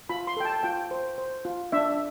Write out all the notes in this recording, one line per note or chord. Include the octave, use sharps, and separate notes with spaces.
F4 B5
C6
A4 G5
A5
F4 G5
C5
C5
F4
D4 E5